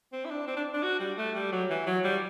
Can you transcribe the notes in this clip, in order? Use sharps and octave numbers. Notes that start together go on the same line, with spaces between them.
C4
E4
D4
C4
D4
D4
F#4
G3
A3
G3
F#3
E3
F#3
G3